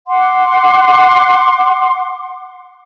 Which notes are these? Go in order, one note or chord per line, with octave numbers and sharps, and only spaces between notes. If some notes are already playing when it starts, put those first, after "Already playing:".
F#5 C6 D6